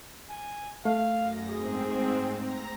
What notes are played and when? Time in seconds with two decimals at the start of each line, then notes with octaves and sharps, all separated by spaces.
0.30 G#5
0.85 A3 F5
1.18 F#2 A#6
1.50 G#2 C4 G#4
2.39 A#5 A#6